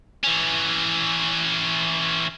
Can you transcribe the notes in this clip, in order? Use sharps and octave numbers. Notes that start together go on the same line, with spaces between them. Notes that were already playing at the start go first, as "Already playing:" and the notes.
E3 C#4